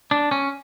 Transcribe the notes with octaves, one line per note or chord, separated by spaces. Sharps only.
D4
C#4